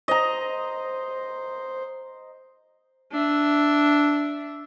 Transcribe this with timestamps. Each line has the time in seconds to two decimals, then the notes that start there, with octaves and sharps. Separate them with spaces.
0.08 C5 D#5 A#5
3.12 D4 E5